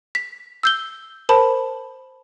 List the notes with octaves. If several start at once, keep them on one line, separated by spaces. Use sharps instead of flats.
B6
E6 G6 G7
A#4 C5 A5 B5